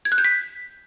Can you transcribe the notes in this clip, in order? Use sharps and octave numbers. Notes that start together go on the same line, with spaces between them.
G#6
F#6
G6
B6